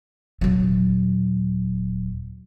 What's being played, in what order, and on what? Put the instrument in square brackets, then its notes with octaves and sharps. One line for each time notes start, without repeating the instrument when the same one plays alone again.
[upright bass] D#1 F#3